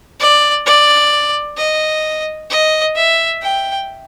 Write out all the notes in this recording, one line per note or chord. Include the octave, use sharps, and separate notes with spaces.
D5
D5
D#5
D#5
E5
G5